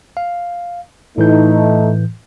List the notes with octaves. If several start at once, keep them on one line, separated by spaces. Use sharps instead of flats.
F5
A2 E3 A3 D#4 G6